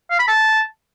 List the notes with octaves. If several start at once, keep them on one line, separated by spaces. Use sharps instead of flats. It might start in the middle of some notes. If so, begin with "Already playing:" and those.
F5
B5
A5